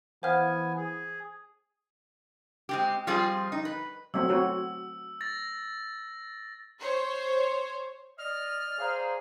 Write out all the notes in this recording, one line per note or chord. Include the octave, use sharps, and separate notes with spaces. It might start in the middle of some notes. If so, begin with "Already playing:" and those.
E3 B3 C5 F5 F#5 G#5 F6
G#4
G#3 C4 G4
F3 G3 C4 F4 G#4
D#4
B4
F#3 A3 C4 E6
C4 F#4 C#5
A6 A#6
C5 C#5
D5 D#5 F6
G#4 C5 D5 F5 A#5